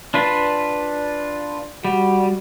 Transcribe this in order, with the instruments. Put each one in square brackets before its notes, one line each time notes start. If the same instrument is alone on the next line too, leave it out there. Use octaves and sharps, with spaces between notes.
[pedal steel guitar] D4 F4 B4
[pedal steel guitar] G3 [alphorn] F#4